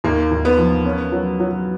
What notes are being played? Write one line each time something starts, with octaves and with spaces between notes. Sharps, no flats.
D#2 A#3
D#2
B3
F3
C#4
F#3
F#3